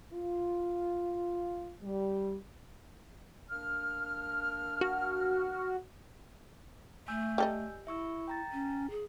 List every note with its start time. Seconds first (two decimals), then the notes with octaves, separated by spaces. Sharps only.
0.14 F4
1.82 G3
3.50 A#3 D4 F6
4.81 F#4
7.08 A3 G#5 E6 G6
7.38 G3 A4 D#5
7.87 E4 E5 C#6 E6
8.28 G5 A#5 A6
8.52 C#4
8.90 G#4